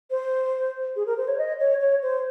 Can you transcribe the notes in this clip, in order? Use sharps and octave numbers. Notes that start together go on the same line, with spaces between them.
C5
G#4
A#4
C5
C#5
D#5
C#5
C#5
C5